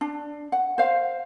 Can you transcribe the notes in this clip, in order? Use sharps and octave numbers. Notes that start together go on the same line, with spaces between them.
D4
F#5
C5 F5